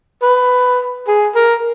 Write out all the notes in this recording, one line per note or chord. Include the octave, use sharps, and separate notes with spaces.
B4
G#4
A#4